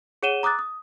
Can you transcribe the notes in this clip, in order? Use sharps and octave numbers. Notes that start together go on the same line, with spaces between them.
G#4 C#5 F#5 D#7 E7 G7
A#5 D6 D#6 F#6 A6
D#6